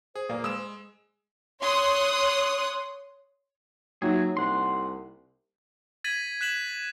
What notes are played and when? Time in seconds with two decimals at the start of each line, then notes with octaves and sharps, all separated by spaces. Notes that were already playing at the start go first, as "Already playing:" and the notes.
0.16 G#4 C5
0.29 A#2 A#3 D5
0.44 G#3 D#6 E6 E7
1.60 C#5 C6 D#6 F#6
4.02 F#3 A#3 D#4 F4 G#4 E5
4.37 C2 F#5 C6
6.04 G#6 A6 B6 D#7 F#7
6.41 F#6 B6 E7 F#7